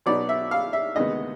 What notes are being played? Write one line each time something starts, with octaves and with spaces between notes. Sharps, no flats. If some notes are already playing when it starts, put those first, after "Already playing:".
B2 F#3 B3 D#4 D5
E5
F5
E5
D2 C3 D#3 G#3 B3 D#5